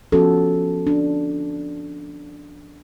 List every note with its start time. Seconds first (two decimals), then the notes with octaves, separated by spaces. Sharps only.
0.12 F3 B3 C#4 F#4 A4
0.87 D4